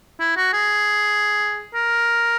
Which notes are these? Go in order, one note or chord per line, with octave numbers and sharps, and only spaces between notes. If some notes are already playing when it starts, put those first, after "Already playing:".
E4
F#4
G#4
A#4